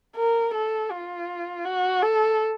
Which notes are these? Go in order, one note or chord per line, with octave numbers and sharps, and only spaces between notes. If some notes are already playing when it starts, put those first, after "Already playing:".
A#4
A4
F4
F#4
A4